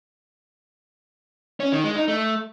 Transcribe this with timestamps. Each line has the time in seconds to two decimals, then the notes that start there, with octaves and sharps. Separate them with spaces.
1.60 C#4
1.72 D#3
1.84 G#3
1.96 D#4
2.08 A3